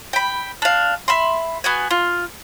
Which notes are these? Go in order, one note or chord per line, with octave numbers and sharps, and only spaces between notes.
G5 B5
D4 F5
E5 B5 C6
B3 F#4 G#5
F4